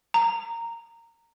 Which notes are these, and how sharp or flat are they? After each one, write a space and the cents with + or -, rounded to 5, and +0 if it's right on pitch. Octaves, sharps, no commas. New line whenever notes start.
A#5 -15